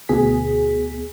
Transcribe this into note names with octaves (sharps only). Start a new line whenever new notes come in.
D2 B2 G#4 B6